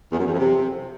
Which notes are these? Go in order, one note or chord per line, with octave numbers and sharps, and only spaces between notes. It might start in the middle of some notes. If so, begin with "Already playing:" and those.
E2
F#2
E2
F2
C3